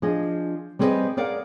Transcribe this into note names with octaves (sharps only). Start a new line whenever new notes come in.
F3 D4 G#4 D#5
G3 C4 G#4 A4 B4 D#5
G#4 A#4 D5 F5 F#5